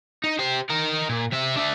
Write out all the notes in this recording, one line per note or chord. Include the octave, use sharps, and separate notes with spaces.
D#4
G4 C5
D#4 A#4
A#2
C3 E5
D4 E5